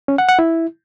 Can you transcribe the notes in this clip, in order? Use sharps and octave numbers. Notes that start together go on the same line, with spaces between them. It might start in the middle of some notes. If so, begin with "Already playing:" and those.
C#4
F#5
F#5
E4